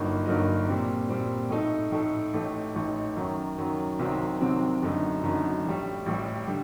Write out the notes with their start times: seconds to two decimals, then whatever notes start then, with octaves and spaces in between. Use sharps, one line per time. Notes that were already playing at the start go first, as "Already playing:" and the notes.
Already playing: G1 G2 F#3 A#3 D#4
0.26 G1 G2 F#3 A#3 D#4
0.68 A#2 G3 C4
1.09 A#2 G3 C4
1.50 A2 A3 D#4 A4
1.92 A2 A3 D#4 A4
2.34 A1 A2 A3 D#4
2.76 A1 A2 A3 D#4
3.16 F#2 D#3 F#3
3.58 F#2 D#3 F#3
3.99 C2 C3 D#3 F#3 C4
4.41 C2 C3 D#3 F#3 C4
4.82 F#1 F#2 D3 A3 D#4
5.23 F#1 F#2 D3 A3 D#4
5.65 A1 A2 G3
6.06 A1 A2 G3
6.47 D3 G3